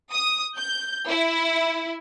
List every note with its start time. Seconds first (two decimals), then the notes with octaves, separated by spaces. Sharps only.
0.14 D#6
0.57 G6
1.08 E4